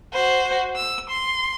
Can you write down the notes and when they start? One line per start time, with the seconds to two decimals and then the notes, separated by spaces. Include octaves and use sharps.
0.13 F#4 C5
0.76 E6
1.10 C6